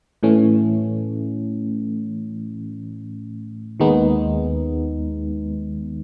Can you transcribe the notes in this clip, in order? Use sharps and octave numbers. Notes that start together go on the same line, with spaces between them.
A2 E3 A3 C#4
D#2 D#3 G#3 B3 D#4